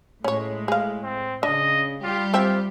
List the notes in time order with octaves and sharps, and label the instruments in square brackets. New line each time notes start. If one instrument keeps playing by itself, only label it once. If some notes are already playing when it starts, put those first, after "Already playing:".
[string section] A2 G#3 [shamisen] C#4 C#5
[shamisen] G#4 F5
[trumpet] C4
[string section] C#3 [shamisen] D4 [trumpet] D#5
[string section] G3 G4 [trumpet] F4
[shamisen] C4 E5 G5 [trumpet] F4